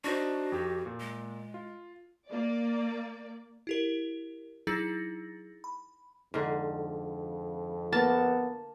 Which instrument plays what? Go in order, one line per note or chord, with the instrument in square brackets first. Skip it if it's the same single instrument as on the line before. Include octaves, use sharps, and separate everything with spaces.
[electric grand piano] D4 D#4 C5 [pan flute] F#4
[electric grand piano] F2 G4
A#2
[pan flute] G#3
[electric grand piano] F4
[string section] A#3 D5
[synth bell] E4 G4 A#4
F#3 D#4 E4 G#4 A6 A#6
B5
[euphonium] F2 [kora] G#2 D3
[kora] A#3 [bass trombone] B3 [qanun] A5